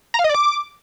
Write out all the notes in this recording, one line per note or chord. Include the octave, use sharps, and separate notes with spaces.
A#5
F5
D#5
D5
D6